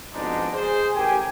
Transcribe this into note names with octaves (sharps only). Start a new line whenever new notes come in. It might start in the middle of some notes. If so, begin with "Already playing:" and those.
F2 G#2 B2 G#3 D4 D#4
G#4 C5
A1 G4 A#4 G5 G#5